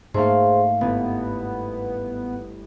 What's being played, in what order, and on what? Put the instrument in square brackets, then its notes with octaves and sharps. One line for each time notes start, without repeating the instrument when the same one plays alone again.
[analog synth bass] G#2 [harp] A3 A#3 F5 [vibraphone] G#4 C5 C6
[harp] G1 [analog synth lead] B3 [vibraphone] E4